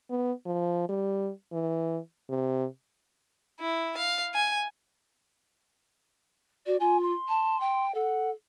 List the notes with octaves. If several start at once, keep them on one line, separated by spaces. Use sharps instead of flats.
B3
F3
G3
E3
C3
E4
F5
G#5
F#4 D5
F4 G#5
C6
A5
G5
A4 F#5